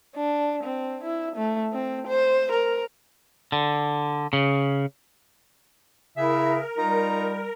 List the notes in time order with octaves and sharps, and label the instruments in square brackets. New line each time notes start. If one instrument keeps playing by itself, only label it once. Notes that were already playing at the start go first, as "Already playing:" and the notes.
[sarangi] D4
C4
E4
A3
C4
C5
A#4
[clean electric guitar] D3
C#3
[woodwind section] C#3 G#4 E5 [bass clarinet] E4 [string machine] A#4
[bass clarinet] G3 [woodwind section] D#4 F4 A#5